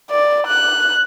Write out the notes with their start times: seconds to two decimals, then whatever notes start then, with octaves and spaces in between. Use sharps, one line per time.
0.11 D5
0.47 F#6